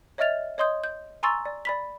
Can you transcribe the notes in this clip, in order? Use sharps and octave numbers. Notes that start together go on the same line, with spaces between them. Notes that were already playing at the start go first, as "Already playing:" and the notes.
C#5 D#5 E5 F6 A6 F7
C#5 D#5 C6 D#6 G6
G6
G#5 A#5 C6 C#6 E6 A6
D5
D5 B5 B6